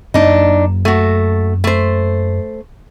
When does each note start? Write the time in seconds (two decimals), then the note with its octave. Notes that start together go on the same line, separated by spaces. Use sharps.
0.14 F#2 A#3 D4 D#4
0.85 A3 F#4
1.64 A3 C5